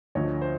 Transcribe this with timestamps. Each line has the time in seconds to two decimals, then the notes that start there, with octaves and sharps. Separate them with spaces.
0.15 D2 D3 F3 C#5 D#5
0.41 C5